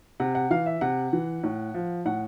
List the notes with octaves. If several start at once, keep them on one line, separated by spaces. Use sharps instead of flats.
C3 F#5
F#5
E3 F5
E5
C3 F#5
E3
A2
F3
A2 F#5